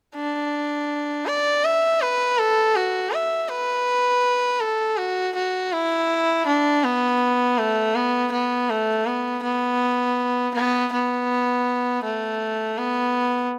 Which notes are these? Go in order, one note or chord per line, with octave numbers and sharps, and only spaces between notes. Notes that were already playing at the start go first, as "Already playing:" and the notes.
D4
D5
E5
B4
A4
F#4
E5
B4
A4
F#4
F#4
E4
D4
B3
A3
B3
B3
A3
B3
B3
B3
B3
A3
B3